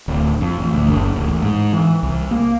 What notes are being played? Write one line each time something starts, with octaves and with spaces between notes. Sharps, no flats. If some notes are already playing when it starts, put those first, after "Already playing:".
D1
F2
A1
D2
F#1
D1
A1
G#2
E3
C2
A#3